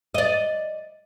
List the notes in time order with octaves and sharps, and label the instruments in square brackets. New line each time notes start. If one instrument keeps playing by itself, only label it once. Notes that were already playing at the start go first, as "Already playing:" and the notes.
[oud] D5 D#5